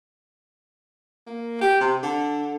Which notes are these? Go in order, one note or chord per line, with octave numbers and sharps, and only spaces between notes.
A#3
G4
C3
D3